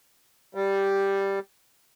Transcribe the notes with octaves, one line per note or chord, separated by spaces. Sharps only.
G3